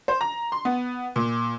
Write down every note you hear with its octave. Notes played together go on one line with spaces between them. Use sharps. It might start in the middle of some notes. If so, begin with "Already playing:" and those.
C5
A#5
C6
B3
A#2